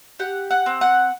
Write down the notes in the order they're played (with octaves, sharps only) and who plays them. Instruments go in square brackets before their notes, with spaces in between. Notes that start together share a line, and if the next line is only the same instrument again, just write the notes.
[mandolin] G4 F#5
F#5
C4
F#5